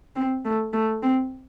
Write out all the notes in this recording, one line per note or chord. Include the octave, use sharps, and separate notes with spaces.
C4
A3
A3
C4